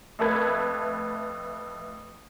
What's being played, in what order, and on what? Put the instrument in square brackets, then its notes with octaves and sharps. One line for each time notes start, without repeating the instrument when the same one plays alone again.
[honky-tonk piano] F2 A3 A4 B4 G#6